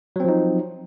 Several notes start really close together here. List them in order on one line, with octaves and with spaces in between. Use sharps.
F#3 C4 F3 D#4